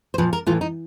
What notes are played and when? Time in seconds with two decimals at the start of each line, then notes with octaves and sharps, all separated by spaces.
0.14 C5
0.18 A#2 F3 B4
0.33 A#4
0.47 A2 E3 F4
0.61 D#4